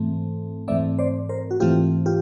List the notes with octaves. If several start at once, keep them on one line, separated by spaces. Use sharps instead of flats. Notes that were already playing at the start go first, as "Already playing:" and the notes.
Already playing: G#2 E3 A3 C4
G#2 E3 A3 C4 D5 E5
C5 D5
A#4 C5
F#4
G#2 E3 A3 C4 F4 G4
F4 G4